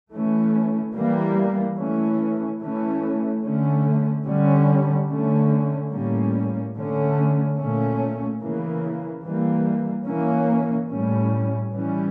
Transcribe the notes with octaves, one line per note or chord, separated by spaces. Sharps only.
E3 A3 C#4
E3 G3 A#3
E3 A3 C#4
E3 A3 C#4
D3 A3 C#4
D3 G3 C#4
D3 A3 C#4
A2 G3 A#3 C#4
D3 A3 C#4
A#2 A3 C#4
C#3 E3 A#3
E3 G3 A#3
E3 A#3 C#4
A2 G3 C#4
E3 G3 C#4